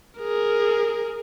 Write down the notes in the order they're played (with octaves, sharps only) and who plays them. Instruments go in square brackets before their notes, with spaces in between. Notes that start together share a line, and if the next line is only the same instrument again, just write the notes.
[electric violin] G#4 A#4